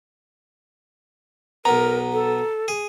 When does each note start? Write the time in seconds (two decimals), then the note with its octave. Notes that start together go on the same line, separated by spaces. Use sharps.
1.65 B1 B3 A#4 A#5
2.12 A4
2.68 G#4